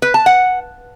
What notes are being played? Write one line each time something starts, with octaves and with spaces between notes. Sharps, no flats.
B4
A5
F#5